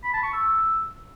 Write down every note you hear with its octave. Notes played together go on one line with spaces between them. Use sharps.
B5
A5
C#6
E6